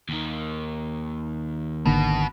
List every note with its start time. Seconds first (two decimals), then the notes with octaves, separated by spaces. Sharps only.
0.09 D#2 D#3
1.86 G#1 B2 D3 A#3